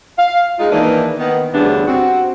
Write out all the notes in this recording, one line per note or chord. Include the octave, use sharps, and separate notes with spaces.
F5
G#3 D#4 F4
D#3 E3 A#3 D4 D#4 B4
D#3 B3
D2 G2 C#3 E3 B3 D4
C4 F#4